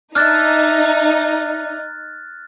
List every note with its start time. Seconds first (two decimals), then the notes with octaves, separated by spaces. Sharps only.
0.15 D4 D#4 E5 F6 F#6 A6